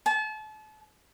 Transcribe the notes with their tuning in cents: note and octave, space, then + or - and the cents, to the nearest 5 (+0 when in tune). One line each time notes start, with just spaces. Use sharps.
A5 -35